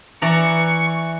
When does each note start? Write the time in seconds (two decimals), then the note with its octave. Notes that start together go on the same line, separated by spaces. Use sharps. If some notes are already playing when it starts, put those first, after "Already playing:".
0.22 E3 D5 A#5 C#6